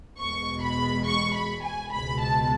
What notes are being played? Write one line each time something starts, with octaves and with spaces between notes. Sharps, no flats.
E2 B2 G#3 C#6
B5
C#6
B5
G#5
C#2 B2 G#3 B5
A5